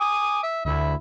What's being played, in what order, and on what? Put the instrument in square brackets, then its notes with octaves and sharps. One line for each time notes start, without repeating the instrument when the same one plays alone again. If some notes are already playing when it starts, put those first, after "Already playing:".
[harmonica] G#5 D6 D#6
E5
[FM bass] D2 [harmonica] E4 E5